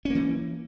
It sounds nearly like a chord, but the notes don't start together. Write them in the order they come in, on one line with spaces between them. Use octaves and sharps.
C#4 A#3 E3